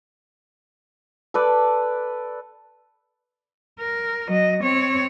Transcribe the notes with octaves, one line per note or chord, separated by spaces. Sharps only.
A4 B4 D5
A#4
F#3 D#5
C4 C#5